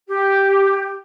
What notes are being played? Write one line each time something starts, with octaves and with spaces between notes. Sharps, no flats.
G4